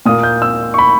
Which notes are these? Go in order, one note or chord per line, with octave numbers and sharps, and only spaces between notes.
A#2 A#3 D#6
G6
E6
C#6
B5